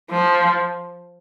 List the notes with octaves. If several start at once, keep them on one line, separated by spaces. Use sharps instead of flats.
F3